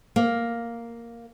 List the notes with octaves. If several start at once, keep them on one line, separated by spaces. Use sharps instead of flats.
A#3